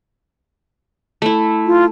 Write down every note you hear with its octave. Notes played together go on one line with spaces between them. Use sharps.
A3 E4
F4